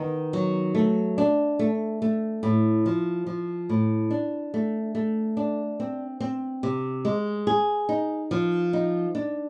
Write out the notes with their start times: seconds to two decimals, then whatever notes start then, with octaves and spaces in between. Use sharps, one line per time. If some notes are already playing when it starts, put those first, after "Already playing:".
Already playing: D#3 B3
0.33 F#3
0.75 A3
1.18 D4
1.59 A3
2.02 A3
2.43 A2
2.86 F3
3.27 F3
3.70 A2
4.11 D4
4.54 A3
4.95 A3
5.37 D4
5.80 C4
6.21 C4
6.63 C3
7.05 G#3
7.47 G#4
7.89 D#4
8.31 F3
8.73 D#4
9.15 D4